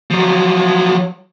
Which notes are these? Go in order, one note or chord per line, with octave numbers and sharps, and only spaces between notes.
F3 F#3